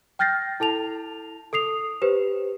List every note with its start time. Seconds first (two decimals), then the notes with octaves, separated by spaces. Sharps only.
0.19 G5 F6 G6 A6 A#6 C7
0.60 E4 A4 A5 F7
1.53 A4 D#6 C7 F7
2.02 G4 B4 C5